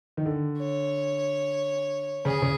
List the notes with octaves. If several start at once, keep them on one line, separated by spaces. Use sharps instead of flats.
D#3
D3
C#5
C#3 G#4
C#3